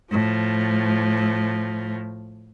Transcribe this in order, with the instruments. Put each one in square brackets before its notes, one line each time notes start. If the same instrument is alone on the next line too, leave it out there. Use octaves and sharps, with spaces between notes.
[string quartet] A2 F3